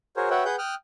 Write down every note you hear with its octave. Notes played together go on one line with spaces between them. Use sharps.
F#4 G#4 A#4 C5 C#5
F#4 B4 C#5 E5 F#5 G5
G#4 B4 F#5 G6
G5 D#6 F6 F#6